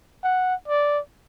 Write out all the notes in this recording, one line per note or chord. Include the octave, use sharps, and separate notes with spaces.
F#5
D5